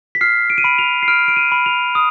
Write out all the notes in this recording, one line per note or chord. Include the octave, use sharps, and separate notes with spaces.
B6
F6 C7
D7
D#7
B5 D7
F7
C7
F6 D7
D7
D#7
B5
F7
D#6